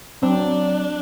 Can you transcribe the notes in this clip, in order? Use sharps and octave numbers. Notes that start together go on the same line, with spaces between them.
F#3 C4 D4